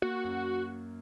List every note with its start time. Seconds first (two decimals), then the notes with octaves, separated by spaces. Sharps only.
0.02 A#3 F#4
0.24 F#2